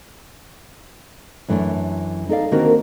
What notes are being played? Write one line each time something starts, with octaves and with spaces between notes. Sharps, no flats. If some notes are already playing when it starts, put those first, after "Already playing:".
F#2 E3 A3 B3 D4
D#4 A4 D5 F5
D3 D#3 A#3 C4 F#4 A#4